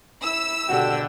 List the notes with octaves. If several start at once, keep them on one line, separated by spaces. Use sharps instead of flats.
E4 E6
G#1 B2 D3 F#4 G4 G5